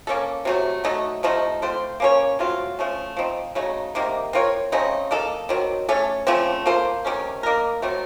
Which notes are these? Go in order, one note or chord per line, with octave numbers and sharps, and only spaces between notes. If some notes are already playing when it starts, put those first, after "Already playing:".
A#3 C#4 A4
C3 F#3 A3
F#3 A3 D#4 A4
C3 F3 A3 D#4
A3 C4 F4 C5
A#3 C#4 A4 C#5
F#3 A3 C4 F4
F3 A3 C#4
F3 C4 D#4
C#3 F#3 A3 D#4
C3 D#3 A#3
C4 F4 A#4 C#5
C#3 A3 C4 D#4
A#3 D#4 A4
D#3 F#3 C4
A3 C#4 A4 C#5
C#3 F3 A3 C4
A#3 F4 A4 C5
C3 D#3 A3 C#4
A#3 D#4 A#4
D#3 F#3 A3 C4